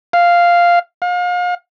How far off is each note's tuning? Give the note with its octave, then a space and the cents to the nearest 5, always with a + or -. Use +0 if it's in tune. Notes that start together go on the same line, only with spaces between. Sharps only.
F5 -5
F5 +35